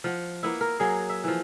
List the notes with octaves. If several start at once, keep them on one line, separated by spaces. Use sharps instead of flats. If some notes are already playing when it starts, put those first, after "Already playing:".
F3 F#5
A#3 B3 E4
A#4
F#3 A#3 G#4
E5
E3 F3